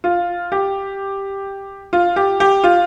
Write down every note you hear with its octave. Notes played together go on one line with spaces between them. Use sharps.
F4
G4
F4
G4
G4
F4